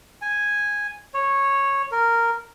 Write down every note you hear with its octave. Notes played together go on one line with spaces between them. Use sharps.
G#5
C#5
A#4